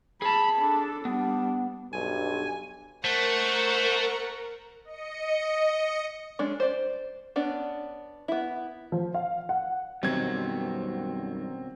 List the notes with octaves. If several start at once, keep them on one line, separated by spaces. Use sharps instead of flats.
G#4 A5 B5
D4 A4
G3 B3 D4
B1 G2 G#5
A3 A#4 C5 F#5 C#6
D#5 C#7
G#3 C#4 D4
C5 D5
B3 C#4 D4
B3 E4
F3
F5
F#5
F#2 B2 D#3 F#3 G3 C4 G#6